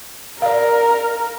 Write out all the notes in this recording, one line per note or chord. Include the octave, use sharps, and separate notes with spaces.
A#4 D5 F5